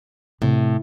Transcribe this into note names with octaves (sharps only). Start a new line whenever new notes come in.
A2 C3